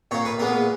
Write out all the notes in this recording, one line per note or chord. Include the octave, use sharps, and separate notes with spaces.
A#2 A#3 C#5
B4
A#2 G#3 B3 A#4